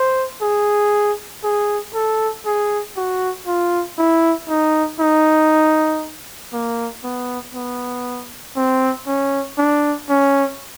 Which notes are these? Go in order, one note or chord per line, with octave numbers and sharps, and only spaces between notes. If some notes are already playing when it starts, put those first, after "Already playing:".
Already playing: C5
G#4
G#4
A4
G#4
F#4
F4
E4
D#4
D#4
A#3
B3
B3
C4
C#4
D4
C#4